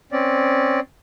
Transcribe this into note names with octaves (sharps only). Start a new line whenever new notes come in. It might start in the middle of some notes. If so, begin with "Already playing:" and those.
C4 C#4 D5